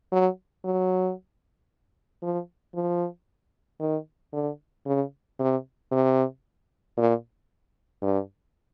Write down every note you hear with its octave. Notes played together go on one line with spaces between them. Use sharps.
F#3
F#3
F3
F3
D#3
D3
C#3
C3
C3
A#2
G2